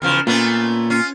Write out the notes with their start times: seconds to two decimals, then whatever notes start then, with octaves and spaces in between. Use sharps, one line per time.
0.02 E2 C#3 F3 A#4
0.27 A#2 A3 B3 C#4 F4
0.90 C#4 F4